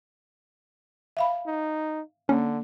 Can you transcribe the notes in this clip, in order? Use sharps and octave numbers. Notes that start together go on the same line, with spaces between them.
E5 F5 B5
D#4
D3 A#3 C#4